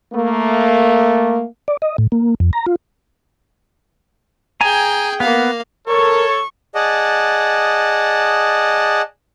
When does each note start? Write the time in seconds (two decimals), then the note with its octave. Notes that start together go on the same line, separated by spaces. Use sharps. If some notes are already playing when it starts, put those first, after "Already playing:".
0.14 A3 A#3
1.68 D5
1.82 D#5
1.98 A2
2.12 A#3
2.40 F2
2.53 A#5
2.66 F4
4.61 G#4 G5 G#5 A#5
5.20 A#3 B3 F5
5.88 A4 A#4 C#5 C#6
6.75 G#4 D5 D#5 F#5 A5